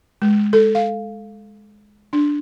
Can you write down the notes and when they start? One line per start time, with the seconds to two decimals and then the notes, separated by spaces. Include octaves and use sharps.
0.22 G#3
0.53 A4
0.75 F5
2.13 D4